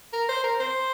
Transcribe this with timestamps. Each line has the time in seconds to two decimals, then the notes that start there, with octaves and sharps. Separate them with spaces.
0.13 A#4
0.29 C5
0.44 A#4
0.60 C5